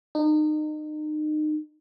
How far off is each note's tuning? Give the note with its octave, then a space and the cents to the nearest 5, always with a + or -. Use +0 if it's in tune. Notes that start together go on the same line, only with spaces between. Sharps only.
D#4 -30